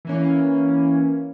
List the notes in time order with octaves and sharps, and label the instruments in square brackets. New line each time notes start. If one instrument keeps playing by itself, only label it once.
[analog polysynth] E3 A#3 C#4